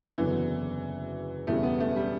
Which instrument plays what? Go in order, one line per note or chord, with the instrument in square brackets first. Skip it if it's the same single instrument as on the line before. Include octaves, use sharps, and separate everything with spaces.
[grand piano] F#1 E2 D3 F#3 B3 [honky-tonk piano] E3
[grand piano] E1 E2 C#3 G3 [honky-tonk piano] A3
[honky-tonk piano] B3
A3
G3